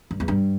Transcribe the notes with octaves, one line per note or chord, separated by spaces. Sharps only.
G2
E2
G2